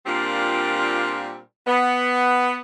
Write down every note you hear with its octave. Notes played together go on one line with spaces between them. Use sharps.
A#2 G3 A#3 C4 D4 F4
B3